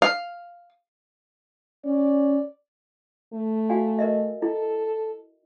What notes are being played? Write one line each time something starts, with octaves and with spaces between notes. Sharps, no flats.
F5
C#4 D5
A3
F#4 F5 G#5
A#4 D#5 E5
E4 A4